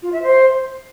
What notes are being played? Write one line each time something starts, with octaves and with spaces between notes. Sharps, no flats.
F4
E5
C5